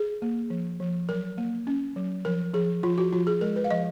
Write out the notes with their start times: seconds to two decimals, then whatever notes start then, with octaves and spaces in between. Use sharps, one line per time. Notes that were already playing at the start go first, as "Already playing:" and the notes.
Already playing: G#4
0.22 A#3
0.50 F3
0.80 F3
1.09 F#3 A#4
1.38 A#3
1.67 C#4
1.96 F#3
2.25 F3 A#4
2.54 F3 G#4
2.83 F3 F4
2.98 F#4
3.12 F3 F4
3.27 G#4
3.41 G#3 A#4
3.56 B4
3.64 F5
3.70 F3 D#5